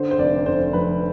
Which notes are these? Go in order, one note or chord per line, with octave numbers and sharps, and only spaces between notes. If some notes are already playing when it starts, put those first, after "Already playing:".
Already playing: D3 C5
C5
F1 D5
F1 C5
F2 B4